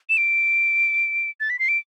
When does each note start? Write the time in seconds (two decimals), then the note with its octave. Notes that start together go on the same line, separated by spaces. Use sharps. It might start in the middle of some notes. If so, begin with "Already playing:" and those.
0.09 E7
0.17 D7
1.40 A6
1.50 B6
1.59 C7
1.68 D7